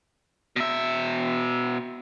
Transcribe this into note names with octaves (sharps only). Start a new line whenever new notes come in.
B2 E5